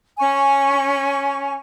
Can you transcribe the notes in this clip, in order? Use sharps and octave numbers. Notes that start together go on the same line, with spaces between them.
C#4 G#5 C#6